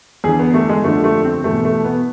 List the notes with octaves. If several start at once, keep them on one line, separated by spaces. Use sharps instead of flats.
E2 D3 G#4
B3
A3
G#3
F2 D3 A3
A3
C4
E2 B2 A3
A3
B3